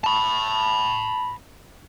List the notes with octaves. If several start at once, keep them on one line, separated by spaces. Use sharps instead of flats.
A5 B5